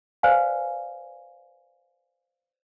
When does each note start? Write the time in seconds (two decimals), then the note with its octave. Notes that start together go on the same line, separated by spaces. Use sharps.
0.23 B4 C5 D5 D#5 F5 G#5